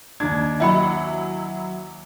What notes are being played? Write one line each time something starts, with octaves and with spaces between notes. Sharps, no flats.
D#2 D4 G#6
F#3 E4 D#5 G5 B5